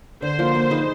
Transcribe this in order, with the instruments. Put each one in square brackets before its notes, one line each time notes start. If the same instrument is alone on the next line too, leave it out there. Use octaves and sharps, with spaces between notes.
[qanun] D3 [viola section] C5
[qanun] F3 A#3
A#3
D#4 G#4 B4